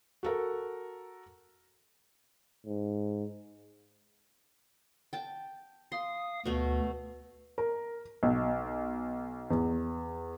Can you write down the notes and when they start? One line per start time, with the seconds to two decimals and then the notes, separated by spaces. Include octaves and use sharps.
0.23 F#4 A4 A#4
2.66 G#2
5.13 G5 A5
5.92 F5 C6 D#6
6.45 D2 B2 A3
7.58 A#4
8.23 B1
9.50 E2